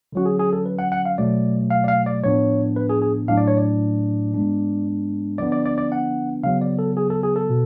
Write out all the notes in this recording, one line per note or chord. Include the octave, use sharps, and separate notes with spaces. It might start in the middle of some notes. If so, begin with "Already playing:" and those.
D3 F#3 C#4 F#4
G#4
G#4
A4
B4
F#5
F#5
F5
B2 F#3 A3 D5
F5
D5
F5
D5
A2 F3 B3 D4 C#5
B4
G#4
G#4
A2 F#3 A3 D4 F5
D5
C#5
D5
G#2 G#3 B3 D4
D3 F3 B3 D4 D5
D5
D5
D5
F#5
C#3 F#3 B3 F5
D5
A4
G#4
A4
G#4
A4
B2